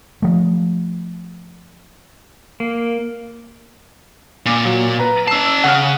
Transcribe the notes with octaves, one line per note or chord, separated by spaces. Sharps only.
F3 A3
A#3
A#2
F#3
B4 A#5
C#4 A5 E6 C7
C#3 F#5 F6